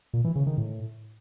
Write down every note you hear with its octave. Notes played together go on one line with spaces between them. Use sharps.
A#2
E3
C#3
D#3
A2